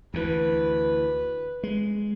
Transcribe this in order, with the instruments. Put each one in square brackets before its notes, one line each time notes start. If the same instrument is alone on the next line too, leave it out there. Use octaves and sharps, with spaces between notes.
[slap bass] D2 E3 [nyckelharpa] B4
[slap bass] G#3